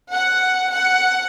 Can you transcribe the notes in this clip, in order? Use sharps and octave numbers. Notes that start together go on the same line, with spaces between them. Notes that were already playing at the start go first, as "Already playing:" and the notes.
F#5
F#5